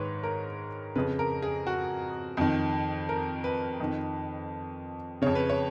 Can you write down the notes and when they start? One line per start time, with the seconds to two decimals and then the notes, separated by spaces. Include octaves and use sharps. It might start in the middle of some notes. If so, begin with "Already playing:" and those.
Already playing: G#2 D#3 B4 C#5
0.23 A#4
0.95 F2 C#3 B4
1.19 A#4
1.42 G#4
1.67 F#4
2.37 F2 D#3
3.09 A#4
3.44 B4
3.80 F2 D#3
5.22 F2 C#3 C#5
5.35 B4
5.50 C#5